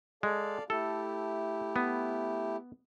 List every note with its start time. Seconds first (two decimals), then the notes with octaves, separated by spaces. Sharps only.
0.23 G#3 A4 D5 F5
0.70 A3 E4 G4 A4
1.76 B3